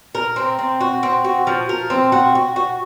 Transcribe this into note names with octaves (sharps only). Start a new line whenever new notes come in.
A#4
C4
C4
F#4
C4
F#4
F3
A#4
C4
F#4
F#4
F#4